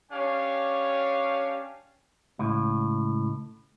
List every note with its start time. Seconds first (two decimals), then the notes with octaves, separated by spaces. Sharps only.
0.11 C#4 D4 G4 C#5 F5 G#5
2.39 C#2 A2